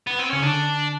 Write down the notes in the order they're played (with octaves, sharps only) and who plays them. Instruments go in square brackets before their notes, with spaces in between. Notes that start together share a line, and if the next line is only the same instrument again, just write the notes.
[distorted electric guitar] B3
C4
[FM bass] C#3 [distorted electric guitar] C#4
[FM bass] D3 [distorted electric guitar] D4